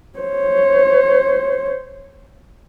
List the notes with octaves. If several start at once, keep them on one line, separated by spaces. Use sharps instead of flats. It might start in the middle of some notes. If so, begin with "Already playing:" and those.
C5 C#5